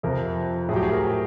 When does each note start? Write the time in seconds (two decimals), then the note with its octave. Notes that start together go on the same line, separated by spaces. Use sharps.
0.03 F2 C3 F3 A#4
0.69 A2 G#4
0.73 F#3 G4
0.83 G#4
0.92 A#4